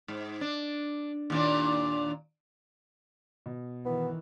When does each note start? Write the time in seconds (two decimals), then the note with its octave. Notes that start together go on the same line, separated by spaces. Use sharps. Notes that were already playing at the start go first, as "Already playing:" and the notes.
0.08 G#2
0.41 D4
1.30 D#2 A#2 D4
3.46 B2
3.85 D#3 E3 B3